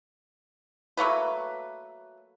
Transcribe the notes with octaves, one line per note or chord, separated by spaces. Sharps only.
F#3 A3 A#3 B4